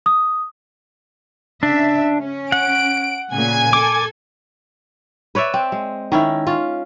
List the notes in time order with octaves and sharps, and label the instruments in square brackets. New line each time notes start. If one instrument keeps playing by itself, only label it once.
[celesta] D#6
[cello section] C#3 E5 [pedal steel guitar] D4
[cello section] C#4
[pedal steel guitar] F#5 [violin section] D7
[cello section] A#2 C#3 [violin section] G#5 G#6
[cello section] A4 [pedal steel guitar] D6
[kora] B4 C#5 D5 E5
C4
G#3
D#3 C#4 E4
C#4 F4